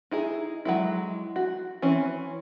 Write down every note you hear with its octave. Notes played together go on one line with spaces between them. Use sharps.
D#4 E4 G#4
F#3 G#3 E4
F#4
E3 C4 C#4